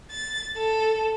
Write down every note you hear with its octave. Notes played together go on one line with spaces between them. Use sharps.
A6
A4